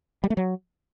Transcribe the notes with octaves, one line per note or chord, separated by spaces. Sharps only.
G3
A3
F#3